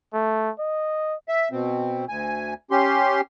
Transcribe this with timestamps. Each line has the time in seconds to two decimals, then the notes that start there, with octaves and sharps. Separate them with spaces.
0.14 A3
0.59 D#5
1.29 E5
1.52 B2 C4
2.09 D2 G#5
2.71 C#4 G4 C6